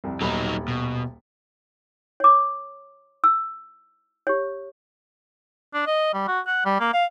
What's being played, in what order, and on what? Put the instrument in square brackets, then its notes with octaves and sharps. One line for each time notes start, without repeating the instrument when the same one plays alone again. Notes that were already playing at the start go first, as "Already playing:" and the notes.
[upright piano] C2 F2
[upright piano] D#1 B1 B5 [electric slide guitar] F#3 D#4
[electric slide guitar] B2
[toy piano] C#5 D6
E6
G4 C#5
[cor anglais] D4
D#5
G3
F#4
F#5
G3
A#3
F5